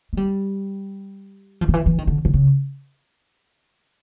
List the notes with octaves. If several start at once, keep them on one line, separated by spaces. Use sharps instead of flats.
G#3
G3
F3
D#3
E3
E3
D#3
D3
D3
C#3